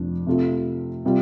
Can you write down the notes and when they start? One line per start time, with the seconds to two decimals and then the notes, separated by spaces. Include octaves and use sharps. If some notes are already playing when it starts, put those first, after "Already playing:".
Already playing: F1 F2 F3 D4
0.27 C3 A3 F4 A4
1.05 C3 G3 F4